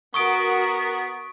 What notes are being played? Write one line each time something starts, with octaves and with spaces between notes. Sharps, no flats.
B3 F#4 A#4 C#6 D#6 D7